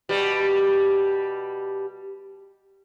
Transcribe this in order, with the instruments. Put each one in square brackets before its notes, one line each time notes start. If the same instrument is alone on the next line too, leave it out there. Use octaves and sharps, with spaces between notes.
[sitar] B2 G3